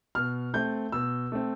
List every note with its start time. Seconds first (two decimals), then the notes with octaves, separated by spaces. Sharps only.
0.15 B2 F6
0.54 A3 C4 G6
0.92 B2 E6
1.32 A3 C4